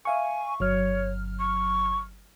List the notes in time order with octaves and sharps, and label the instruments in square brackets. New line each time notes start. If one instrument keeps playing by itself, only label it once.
[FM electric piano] E5 F5 C#6 [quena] G#5
[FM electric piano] G1 F#3 F6 [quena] C#5
[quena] C#6